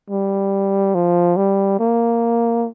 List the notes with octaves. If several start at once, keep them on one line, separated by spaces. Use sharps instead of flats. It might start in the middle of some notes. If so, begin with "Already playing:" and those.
G3
F3
G3
A#3